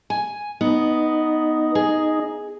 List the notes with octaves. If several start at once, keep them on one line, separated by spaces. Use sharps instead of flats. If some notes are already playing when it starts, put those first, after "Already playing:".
G#5
B3 D#4
G#4